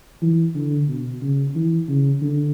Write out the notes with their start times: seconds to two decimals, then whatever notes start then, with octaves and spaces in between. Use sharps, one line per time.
0.22 E3
0.55 D3
0.88 B2
1.21 C#3
1.55 E3
1.88 C#3
2.22 D3